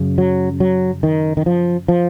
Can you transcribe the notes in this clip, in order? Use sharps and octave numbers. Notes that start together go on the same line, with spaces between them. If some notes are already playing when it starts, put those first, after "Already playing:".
Already playing: F#2 C#3
F#3
F#3
D#3
D#3
F3
F3